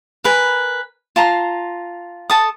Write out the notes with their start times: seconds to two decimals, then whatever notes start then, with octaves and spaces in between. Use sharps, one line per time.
0.24 A#4 B4 G#5
1.16 F4 A5 A#5 C6
2.30 A4 A5 D#6